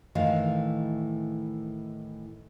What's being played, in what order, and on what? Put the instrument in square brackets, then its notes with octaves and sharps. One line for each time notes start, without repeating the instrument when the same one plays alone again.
[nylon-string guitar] A2 D#3 E3 D#4 D#5 F5